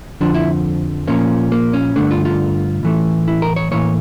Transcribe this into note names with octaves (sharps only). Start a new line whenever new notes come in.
F2 D3 F3 D4
E4
A#2 F3 A#3 C#4
A#3
C#4
G2 D3 A3 D4
F4
F4
A2 E3 A3
E4
A#4
C#5
A2 E3 A#3 C#5